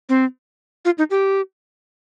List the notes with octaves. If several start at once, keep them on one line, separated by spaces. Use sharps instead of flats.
C4
F4
D#4
G4